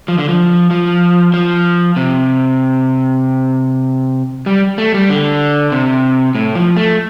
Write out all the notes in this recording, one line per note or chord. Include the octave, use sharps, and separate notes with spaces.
F3
D3
F3
F3
F3
C3
G3
A3
G3
D3
C3
A2
F3
A3